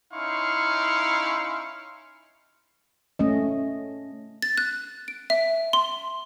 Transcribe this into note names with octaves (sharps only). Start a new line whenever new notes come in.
C#4 D#4 E4 F5 C6 C#6
A3 C#4 D#5
A6
F#6
D7
E5
C6